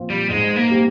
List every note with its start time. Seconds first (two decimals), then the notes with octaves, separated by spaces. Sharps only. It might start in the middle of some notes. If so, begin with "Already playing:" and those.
Already playing: A#2 F3 C4 F4
0.10 G3
0.29 G#2 G#3
0.56 A#3
0.69 G3 C4 G4